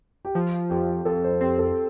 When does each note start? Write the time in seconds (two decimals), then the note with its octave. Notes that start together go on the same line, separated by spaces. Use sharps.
0.25 G4
0.35 F3 F4
0.70 F2 G4
1.05 F2 A4
1.24 C5
1.41 C4 G4
1.59 A4